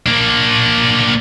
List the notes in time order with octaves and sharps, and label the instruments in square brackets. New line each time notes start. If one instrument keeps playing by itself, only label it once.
[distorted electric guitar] A#3 D4